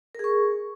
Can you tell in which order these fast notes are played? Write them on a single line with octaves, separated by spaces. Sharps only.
A#4 G#4 C#6